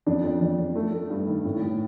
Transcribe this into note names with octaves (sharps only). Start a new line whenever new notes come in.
F2 D4
F2
F2
F2
A3
A3
G2
D#3
A2
A2